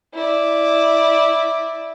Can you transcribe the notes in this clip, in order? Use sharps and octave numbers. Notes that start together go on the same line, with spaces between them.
E4 D5